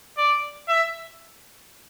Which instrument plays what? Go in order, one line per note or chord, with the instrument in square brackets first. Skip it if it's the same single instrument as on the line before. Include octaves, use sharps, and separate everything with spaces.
[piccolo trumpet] D5
E5